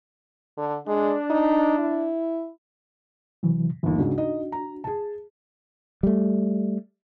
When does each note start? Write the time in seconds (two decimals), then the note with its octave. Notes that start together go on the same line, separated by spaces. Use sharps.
0.58 D3
0.87 G#3 D4
1.30 D#4
1.79 E4
3.43 C3 E3 F#3
3.83 G1 D#2 E3
3.98 G#2 C#3 D4 F#4
4.18 D#4 D#5
4.52 A#5
4.84 G#4 A5
6.03 G3 A3